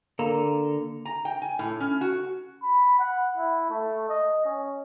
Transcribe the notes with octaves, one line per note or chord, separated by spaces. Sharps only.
D3 A#3 A4 A#5
A#5
G5
G#5
A2
C#4
F#4
B5
F#5
E4
A3
D#5
C#4